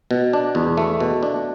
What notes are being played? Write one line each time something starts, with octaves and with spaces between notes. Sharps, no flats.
B2
D4
E2
A3
B2
D4